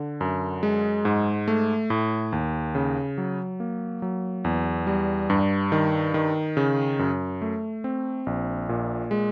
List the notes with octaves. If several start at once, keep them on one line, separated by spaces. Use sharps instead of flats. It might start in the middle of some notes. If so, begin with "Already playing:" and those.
Already playing: D3
F#2
G#3
G#2
A3
A2
D#2
C#3
F#3
A#3
F#3
E2
G3
G2
D#3
D#3
C#3
F#2
A3
C4
A#1
A#2
G#3